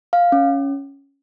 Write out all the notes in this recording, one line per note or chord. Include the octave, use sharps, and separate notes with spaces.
F5
C#4